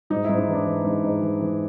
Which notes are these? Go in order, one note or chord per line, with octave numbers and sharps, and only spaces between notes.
G#2 D#4
G#2 E4
D#4
E3 D4
E3
G#2
G#2
E3
E3